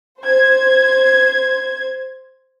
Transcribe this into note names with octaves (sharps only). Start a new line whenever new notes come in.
C5 G#6